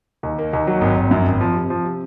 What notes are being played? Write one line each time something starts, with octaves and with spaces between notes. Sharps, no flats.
D#2
A#3
D#2
F#3
G#1
G#1
F#2
G#1
F3
C3
F3
C3